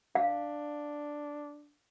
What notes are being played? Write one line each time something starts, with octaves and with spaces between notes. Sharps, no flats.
D4 F5